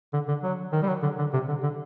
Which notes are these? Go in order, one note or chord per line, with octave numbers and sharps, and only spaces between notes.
D3
D3
F#3
D#3
G3
F#3
D3
D3
C3
D3
D3